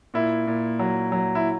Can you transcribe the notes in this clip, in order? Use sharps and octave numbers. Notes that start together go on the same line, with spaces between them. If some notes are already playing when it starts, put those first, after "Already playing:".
A#2 E4
A#2
F#3
F#3
E4